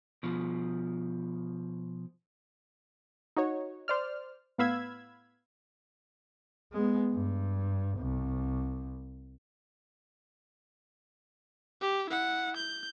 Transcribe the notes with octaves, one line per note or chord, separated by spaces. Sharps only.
B2 F3
D#4 F#4 C#5
C5 D5 F6
A2 B3 F5 B5 E6 G#6
G#3 B3
G2
C2
G4
E4 F#5
G6